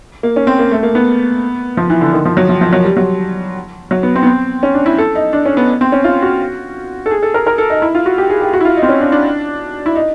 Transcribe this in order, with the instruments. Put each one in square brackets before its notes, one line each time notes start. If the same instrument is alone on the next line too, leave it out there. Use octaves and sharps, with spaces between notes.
[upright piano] A#3
C#4
C4
A#3
A3
A#3
B3
F3
E3
D3
D#3
F3
F#3
F3
F3
F#3
G3
F#3
F#3
B3
C4
B3
C4
C#4
D4
E4
A4
D#4
D4
C#4
B3
C4
C#4
F4
F#4
A4
G#4
A4
A#4
A#4
A4
D#4
E4
F4
F#4
G4
G#4
G4
F#4
E4
F4
D#4
C4
C#4
D4
D4
E4
D#4